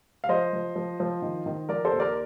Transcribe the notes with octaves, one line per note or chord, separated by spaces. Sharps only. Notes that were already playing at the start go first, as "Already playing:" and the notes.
F5
F3 C5 D#5
F3
F3
F3
D#3
D#3
F3 A#4 D5
A4 C5
D#2
A#4 D5